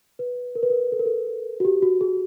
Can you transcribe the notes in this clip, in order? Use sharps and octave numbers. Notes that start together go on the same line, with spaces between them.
B4
A#4
B4
A#4
A4
A#4
A4
F#4
G4
F#4
G#4